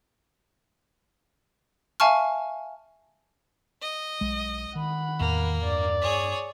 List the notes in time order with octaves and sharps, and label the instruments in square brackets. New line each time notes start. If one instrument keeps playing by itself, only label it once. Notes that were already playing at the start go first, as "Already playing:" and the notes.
[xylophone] E5 F5 G#5 A5 C#6 F6
[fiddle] D#5
[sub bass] B1 [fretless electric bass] G#3
[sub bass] D#3 [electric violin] F#5 B5
[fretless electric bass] E2 A2 [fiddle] A#3
[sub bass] G2 [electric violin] D5
[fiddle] G#4 C#5